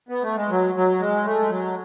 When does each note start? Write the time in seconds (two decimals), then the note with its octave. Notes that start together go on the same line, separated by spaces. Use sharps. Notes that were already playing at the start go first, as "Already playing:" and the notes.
0.09 B3
0.22 A3
0.36 G#3
0.50 F#3
0.75 F#3
1.00 G#3
1.24 A3
1.39 G#3
1.49 F#3